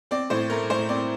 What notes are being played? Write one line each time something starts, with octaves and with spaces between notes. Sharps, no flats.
C4 D5
A2 C5
A3 A#4
A2 C5
C4 D5